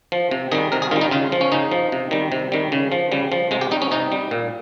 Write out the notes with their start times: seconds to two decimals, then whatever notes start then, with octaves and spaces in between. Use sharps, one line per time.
0.12 F3
0.31 C3
0.52 D#3 G#4
0.55 G3
0.72 C3 A#4
0.82 G#4
0.91 D#3 F4
0.96 G3
1.01 D#4
1.11 C#3 F4
1.32 F3
1.41 C#4
1.52 C#3 D#4
1.71 F3
1.92 C3
2.11 D#3 G3
2.32 C3
2.52 D#3 G3
2.72 C#3
2.92 F3
3.12 C#3 G3
3.32 F3
3.51 C3 G#3
3.61 G4
3.71 G3 D#4
3.82 C#4
3.91 C3 D#4
4.12 G3
4.31 A#2